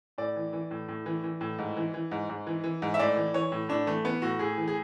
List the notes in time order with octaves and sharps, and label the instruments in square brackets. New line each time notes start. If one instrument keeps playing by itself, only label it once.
[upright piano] A2 D5
E3
E3
A2
A2
E3
E3
A2
G#2
E3
E3
G#2
G#2
E3
E3
G#2
E5
A2 D5
E3
E3 C#5
A2
A2 D4
E3 A3
E3 B3
A2 F#4
A2 G#4
E3
G#4